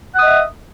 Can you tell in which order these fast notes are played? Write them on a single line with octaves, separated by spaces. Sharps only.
F#5 D#6 D#5 E5